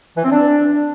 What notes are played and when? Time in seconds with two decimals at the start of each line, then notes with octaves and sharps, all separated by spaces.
0.16 E3
0.24 C4
0.31 D4